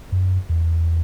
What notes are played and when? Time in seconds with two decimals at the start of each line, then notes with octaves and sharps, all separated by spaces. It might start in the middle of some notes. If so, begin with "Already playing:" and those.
0.12 F#2
0.49 E2